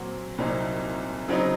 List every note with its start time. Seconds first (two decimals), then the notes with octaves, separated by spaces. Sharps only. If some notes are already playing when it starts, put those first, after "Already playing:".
Already playing: A#2 F#3 C4 F#4
0.38 C2 A#2 F#3 C4 D#4
1.28 C#3 F#3 C4 D#4